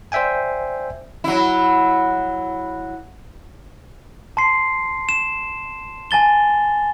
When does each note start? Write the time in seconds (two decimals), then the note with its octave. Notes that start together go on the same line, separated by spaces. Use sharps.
0.12 C5 D5 E5 G5 G#5
1.24 F#3 E4
4.37 A5 C6 C7
5.09 E7
6.11 G#5 A5 A6 G7